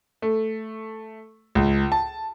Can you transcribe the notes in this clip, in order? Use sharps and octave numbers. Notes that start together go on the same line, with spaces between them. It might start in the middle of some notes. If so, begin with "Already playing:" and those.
A3
C#2
A5